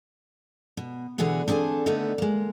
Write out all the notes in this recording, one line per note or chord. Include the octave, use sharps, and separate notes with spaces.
B2
B2 D3 E3 F#4 G#4 F#5
C4 D4 G#4 A4 G#5
D3 D#3 A3 B3 D#4
G#3 A#3